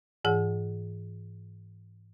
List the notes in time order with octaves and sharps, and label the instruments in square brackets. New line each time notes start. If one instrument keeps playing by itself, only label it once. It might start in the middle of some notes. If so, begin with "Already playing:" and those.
[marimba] G#2 E3 G#4 F#5